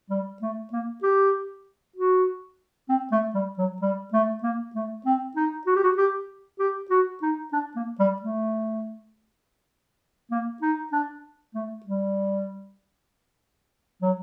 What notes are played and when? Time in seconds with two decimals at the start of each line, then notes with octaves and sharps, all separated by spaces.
0.10 G3
0.42 A3
0.72 A#3
1.03 G4
1.96 F#4
2.89 C4
3.12 A3
3.35 G3
3.58 F#3
3.82 G3
4.13 A3
4.43 A#3
4.75 A3
5.06 C4
5.36 D#4
5.67 F#4
5.76 G4
5.84 F#4
5.97 G4
6.59 G4
6.90 F#4
7.22 D#4
7.53 D4
7.76 A#3
8.00 G3
8.22 A3
10.31 A#3
10.62 D#4
10.92 D4
11.54 A3
11.86 G3
14.02 F#3